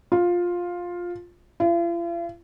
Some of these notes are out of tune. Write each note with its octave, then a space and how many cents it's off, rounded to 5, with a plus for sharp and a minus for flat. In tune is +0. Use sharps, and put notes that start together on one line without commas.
F4 +10
F4 -45